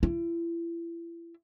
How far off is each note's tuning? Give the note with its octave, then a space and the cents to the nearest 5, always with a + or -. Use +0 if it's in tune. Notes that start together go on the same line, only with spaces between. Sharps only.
E4 +35